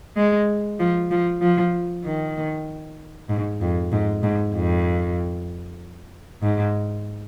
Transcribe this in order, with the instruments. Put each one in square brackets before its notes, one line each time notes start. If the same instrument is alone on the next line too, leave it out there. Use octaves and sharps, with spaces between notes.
[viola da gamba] G#3
F3
F3
F3
D#3
G#2
F2
G#2
G#2
F2
G#2